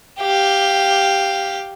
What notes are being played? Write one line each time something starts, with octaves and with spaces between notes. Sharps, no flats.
G4 F5